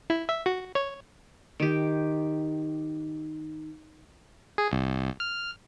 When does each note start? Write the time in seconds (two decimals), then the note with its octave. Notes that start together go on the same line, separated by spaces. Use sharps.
0.10 E4
0.29 E5
0.46 F#4
0.75 C#5
1.60 D#3 G4
4.58 G#4
4.72 C2
5.20 F6